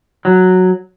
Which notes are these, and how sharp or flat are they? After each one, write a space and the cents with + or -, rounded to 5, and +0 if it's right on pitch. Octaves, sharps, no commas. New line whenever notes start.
F#3 -5